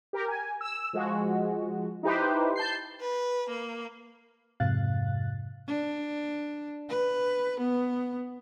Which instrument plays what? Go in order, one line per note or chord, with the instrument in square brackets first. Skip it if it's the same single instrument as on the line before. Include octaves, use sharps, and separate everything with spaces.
[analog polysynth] G4 A#4
G#5
E6
F3 G#3 F#4
D#4 E4 G4 B4 C5
A5 G6 C7
[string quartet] B4
A#3
[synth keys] F2 G#2 C3 F5 F#6 A6
[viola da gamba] D4
B4
B3